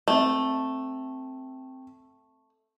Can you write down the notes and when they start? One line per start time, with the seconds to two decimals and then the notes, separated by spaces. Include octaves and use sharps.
0.08 A3 C4